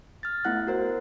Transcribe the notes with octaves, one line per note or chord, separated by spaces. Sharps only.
F6 A6
A3 B3 E4 F#5 F#6
F#4 A#4 C5